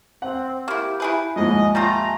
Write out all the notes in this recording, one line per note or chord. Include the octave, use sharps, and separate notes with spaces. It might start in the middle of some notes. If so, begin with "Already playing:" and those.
C4 F#5
A#3 E4 G4
E4 G#4 B4
D#2 G#2 F3 D#5 G#5
G3 A3 F4 A#5